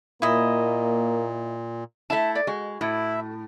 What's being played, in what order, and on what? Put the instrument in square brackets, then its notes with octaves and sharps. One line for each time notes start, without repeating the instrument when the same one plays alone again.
[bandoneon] A#2 [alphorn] A#3 [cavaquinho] E4 D#5
[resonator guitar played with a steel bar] A3 E4 [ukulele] E5 A5
[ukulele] D5
[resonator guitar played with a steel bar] G#3 [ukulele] F#4
[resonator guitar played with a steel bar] A2 [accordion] E4